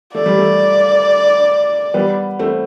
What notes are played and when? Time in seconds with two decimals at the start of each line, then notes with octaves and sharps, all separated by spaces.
0.14 A3 D5
0.26 G3
0.38 A3
1.94 G3 B3
2.39 A3 C4